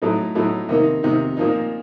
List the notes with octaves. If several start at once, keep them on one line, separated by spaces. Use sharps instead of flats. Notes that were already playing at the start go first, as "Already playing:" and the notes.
A2 F#3 A3 D#4
A2 F#3 A3 D#4
C3 D#3 A#3 D#4
C3 D#3 A#3 D#4
A#2 F3 A#3 D#4